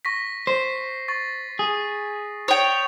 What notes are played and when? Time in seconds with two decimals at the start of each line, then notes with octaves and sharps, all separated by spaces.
0.05 C#6 A#6 B6
0.47 C5 C7
1.08 C#6 A6
1.59 G#4
2.48 C#5 G5 D#6 F7